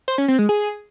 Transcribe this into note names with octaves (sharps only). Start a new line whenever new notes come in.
C5
C#4
C4
G#3
G#4